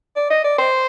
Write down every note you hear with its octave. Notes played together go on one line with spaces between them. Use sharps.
D5
D#5
D5
C5